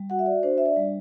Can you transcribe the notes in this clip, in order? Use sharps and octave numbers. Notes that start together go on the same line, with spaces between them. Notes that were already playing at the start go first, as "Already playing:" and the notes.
Already playing: G3
F#4 F#5
E5
D5
D4 C5
E5
D5
G3